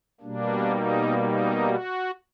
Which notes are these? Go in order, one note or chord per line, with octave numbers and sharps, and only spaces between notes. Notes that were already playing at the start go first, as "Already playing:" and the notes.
B2 G3 A#3 D4
D#4
D#4
F#4